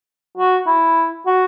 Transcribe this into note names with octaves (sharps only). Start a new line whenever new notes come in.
F#4
E4
F#4